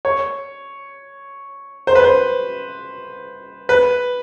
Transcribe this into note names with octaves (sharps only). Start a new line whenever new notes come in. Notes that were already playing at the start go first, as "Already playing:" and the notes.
C#5
C5
B4
C5
B4